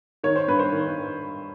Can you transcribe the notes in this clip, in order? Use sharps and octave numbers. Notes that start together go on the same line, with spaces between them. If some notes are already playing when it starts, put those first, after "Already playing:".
D#3 C#5
C5
G2 B4
C5
D#3